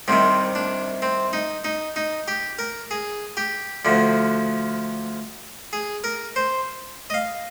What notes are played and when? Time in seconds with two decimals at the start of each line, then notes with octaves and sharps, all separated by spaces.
0.08 C2 C3 D#3 C4
0.55 D4
1.02 C4
1.33 D#4
1.64 D#4
1.96 D#4
2.28 G4
2.59 A#4
2.91 G#4
3.37 G4
3.85 D2 D3 F3
5.73 G#4
6.04 A#4
6.36 C5
7.10 D#5
7.14 F5